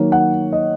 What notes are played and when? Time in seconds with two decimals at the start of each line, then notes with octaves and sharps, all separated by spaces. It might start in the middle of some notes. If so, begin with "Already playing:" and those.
Already playing: D#3 F#3 A#3 C#5
0.12 F#5
0.52 D#5